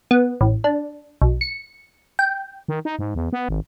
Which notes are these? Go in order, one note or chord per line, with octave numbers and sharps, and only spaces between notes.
B3
A1
D4
B1
C#7
G5
D#3
D#4
G#2
E2
B3
G#1